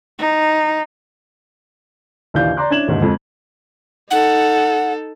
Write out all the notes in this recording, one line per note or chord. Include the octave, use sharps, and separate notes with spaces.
D#4
A#1 D#2 E3 D5 F5 G6
D5 A#5 C6 D6 F#6
C#4 D4 E4 G#6 E7 F#7
E1 A#1 D#2 G#2 D#3
F2 G#3 A4
D#4 A4 F#5